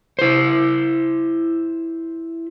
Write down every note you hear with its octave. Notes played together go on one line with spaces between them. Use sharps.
E4 C5